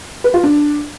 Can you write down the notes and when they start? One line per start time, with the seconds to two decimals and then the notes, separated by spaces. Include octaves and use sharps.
0.24 B4
0.34 F4
0.43 D4